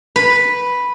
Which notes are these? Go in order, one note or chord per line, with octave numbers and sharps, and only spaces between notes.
B4